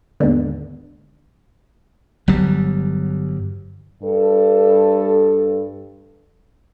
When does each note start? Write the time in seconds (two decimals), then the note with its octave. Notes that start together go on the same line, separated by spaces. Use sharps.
0.20 D#2 G#2 B2 D3
2.28 G1 F#3 G3
4.02 G2 A4